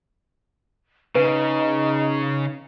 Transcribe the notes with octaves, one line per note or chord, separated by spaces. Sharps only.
C#3 D#4 B4